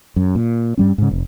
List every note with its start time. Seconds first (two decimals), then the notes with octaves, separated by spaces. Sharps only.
0.16 F#2
0.35 A#2
0.78 G2 G3 C#4
0.98 G#2 C#3
1.11 F1